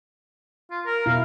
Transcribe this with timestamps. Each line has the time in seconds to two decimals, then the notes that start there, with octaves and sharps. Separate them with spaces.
0.70 F4
0.86 A#4
1.06 B2 E4 F5